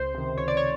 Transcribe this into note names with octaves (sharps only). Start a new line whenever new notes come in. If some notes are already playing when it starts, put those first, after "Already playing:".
Already playing: C#2 C5
C3 D#3
C#2 C#5
D5
C#5